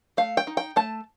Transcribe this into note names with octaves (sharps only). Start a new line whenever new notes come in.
A3 F5
G5
D#4
G5
A3 A5